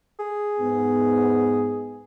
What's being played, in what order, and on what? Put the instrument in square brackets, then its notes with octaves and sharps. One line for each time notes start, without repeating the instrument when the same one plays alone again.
[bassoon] G#4
[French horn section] G#2 B3